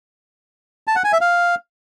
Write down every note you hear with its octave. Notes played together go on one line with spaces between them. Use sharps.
A5
F#5
G#5
E5
F5